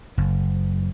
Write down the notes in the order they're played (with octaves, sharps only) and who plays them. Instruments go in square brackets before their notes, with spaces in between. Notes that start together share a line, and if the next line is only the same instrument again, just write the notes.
[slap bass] F#1